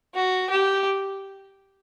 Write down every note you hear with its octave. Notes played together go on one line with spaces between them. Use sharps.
F#4
G4